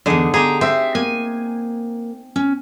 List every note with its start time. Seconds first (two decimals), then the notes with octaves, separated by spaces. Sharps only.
0.06 E2 G2 D3 D#4 G#4
0.34 G4 G#4 A#5
0.61 C4 E5
0.95 A#3 G#5
2.36 C#4